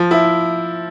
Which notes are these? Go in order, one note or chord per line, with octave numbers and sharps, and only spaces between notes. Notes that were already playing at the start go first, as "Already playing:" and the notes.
Already playing: F3
E4